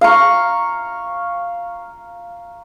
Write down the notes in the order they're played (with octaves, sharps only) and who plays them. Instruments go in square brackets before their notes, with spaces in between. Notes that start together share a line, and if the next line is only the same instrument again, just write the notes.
[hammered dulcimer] F5 A#5 C#6